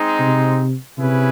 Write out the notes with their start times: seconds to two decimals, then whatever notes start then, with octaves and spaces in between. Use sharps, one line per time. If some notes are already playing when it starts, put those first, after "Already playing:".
Already playing: G#3 C4 D#4
0.19 C3
0.98 C3 C#4 E4 G#4 B4